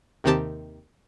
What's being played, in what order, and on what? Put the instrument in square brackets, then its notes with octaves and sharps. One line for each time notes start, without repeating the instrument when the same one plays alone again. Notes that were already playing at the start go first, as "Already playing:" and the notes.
[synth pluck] D#2 C3 D#3 C4 G4 A5